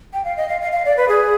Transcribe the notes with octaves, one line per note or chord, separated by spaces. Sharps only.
G5
F5
D#5
F5
F5
F5
D5
B4
G#4